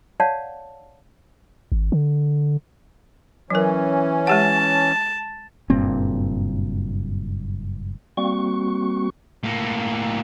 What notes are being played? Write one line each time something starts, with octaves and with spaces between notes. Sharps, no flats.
C#5 D5 F5 F#5 A5
G#1
D3
E3 F#3 C#4 A#4
G#3 G4 F#5 A5
F#1 G2 A#2 C4
G3 A#3 C4 F#4 C#6
A2 A#3